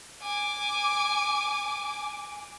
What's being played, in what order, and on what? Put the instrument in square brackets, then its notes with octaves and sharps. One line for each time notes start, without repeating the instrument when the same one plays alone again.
[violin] G#5 D6